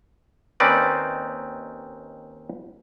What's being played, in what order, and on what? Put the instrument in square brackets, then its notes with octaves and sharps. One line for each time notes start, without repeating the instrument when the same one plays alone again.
[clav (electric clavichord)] D#2 C4 C#4 D#4 B4 D5